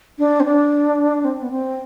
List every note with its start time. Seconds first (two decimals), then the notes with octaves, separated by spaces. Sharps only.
0.19 D4
0.40 C4
0.45 D4
1.25 C4
1.42 B3
1.51 C4